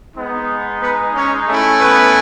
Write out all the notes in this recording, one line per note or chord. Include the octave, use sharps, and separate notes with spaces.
G#3 B3 D#4
B3 B4
C#4 C#5
A3 C#4 E4
B3 B4